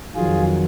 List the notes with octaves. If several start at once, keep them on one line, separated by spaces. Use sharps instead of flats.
F2 D#3 F#3 F4 G#4